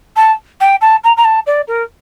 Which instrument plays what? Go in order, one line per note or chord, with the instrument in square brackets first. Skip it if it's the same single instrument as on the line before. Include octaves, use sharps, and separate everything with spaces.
[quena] A5
G5
A5
A#5
A#5
A5
D5
A#4